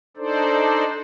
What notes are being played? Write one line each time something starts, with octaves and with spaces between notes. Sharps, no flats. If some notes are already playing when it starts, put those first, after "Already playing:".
D4 D#4 A4 C5 D5